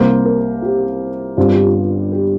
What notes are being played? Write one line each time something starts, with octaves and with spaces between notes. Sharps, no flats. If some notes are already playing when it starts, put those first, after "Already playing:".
Already playing: C2 C3 A#3 C5
A#4
G4
G1 G2 G3 C4 F4
G4
F4
G4